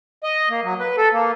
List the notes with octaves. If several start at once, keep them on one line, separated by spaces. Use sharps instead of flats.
D#5
A#3
F#3
B4
A4
A#3